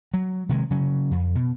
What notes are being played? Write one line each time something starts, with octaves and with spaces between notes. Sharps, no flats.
F#3
C3 D#3 G#3
C#3 F#3 C#4
F2
B2